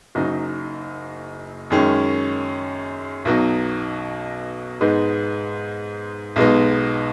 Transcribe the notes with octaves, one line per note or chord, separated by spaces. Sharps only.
F#1 F#2 F#3 D#4
F#2 D#3 G#3 C#4
B1 B2 F#3 D#4
G#2 G#3 B3 D#4
B1 B2 G#3 B3 D#4